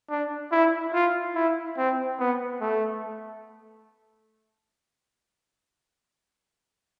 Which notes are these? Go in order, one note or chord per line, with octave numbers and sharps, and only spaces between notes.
D4
E4
F4
E4
C4
B3
A3